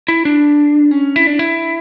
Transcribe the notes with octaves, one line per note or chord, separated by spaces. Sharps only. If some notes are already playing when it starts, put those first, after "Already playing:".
E4
D4
C#4
E4
D4
E4